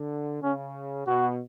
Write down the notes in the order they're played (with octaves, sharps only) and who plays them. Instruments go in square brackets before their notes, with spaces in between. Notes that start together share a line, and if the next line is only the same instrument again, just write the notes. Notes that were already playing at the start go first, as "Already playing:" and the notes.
Already playing: [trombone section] D3
[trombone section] C#3 [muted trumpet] C#4
[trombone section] B2 [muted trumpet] F#4